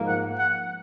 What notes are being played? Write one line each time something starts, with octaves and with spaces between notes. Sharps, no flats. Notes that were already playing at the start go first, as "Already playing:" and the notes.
Already playing: G#2 F3 A#3
F#5
F#5